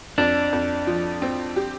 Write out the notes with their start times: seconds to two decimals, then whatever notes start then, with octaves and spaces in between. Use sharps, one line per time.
0.18 F2 D4
0.53 F2
0.87 F3
1.22 C4
1.56 G4